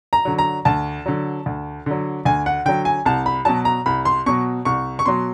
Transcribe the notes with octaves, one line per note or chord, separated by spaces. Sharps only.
A#5
D3 F#3
A#5
D2 A5
D3 F#3
D2
D3 F#3
D2 G#5
F#5
D3 F#3 G5
G#5
C2 A5
B5
B2 F#3 A5
A#5
C2 B5
C6
B2 F#3 C#6
C2 C#6
C#6
B2 F#3 C6